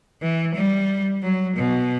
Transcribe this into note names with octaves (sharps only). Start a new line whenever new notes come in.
E3
G3
F#3
B2